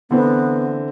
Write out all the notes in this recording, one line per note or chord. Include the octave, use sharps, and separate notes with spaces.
D3 E3 B3 C4